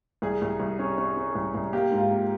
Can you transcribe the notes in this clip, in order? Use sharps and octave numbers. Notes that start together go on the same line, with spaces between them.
C2 G#4
C2
C2
C#4
C#4
C#4
C2
C2
A#3 G4
G#2
F4
A#3